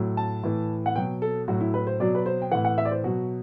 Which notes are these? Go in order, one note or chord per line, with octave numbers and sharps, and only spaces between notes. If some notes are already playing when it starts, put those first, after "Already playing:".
Already playing: A2 F#3
A5
A2 E3
F#5
B2 F#3 G5
A4
A2 F#3 F#4
E4
B4
C5
B2 F#3 D5
B4
C5
G5
A2 E3 F#5
F#5
E5
D5
C5
B2 F#3 F#4